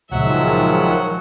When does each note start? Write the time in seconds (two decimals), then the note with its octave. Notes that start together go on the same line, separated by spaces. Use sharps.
0.11 C#2 A#2 D#3 F3 F#3 G#3 E5 F#5